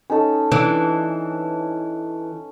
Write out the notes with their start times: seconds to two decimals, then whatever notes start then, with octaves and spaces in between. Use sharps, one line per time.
0.10 C#4 D#4 A4
0.52 E3 D4